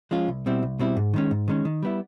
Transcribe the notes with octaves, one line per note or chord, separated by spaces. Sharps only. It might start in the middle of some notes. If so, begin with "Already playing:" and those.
F3 G#3 C#4 F4
C2
B2 G3 C4 E4
C2
B2 G3 C4 E4
G#2
D#3 G#3 C#4
G#2
D#3 G#3 C#4
D#3
G3 B3 E4